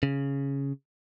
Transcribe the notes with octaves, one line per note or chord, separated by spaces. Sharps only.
C#3